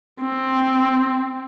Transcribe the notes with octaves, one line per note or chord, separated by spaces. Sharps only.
C4